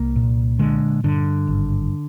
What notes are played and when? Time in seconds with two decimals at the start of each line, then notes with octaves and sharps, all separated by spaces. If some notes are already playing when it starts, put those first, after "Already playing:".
Already playing: C2 A#3
0.16 A#2
0.59 D3 G#3
1.04 G2 D3
1.47 G#1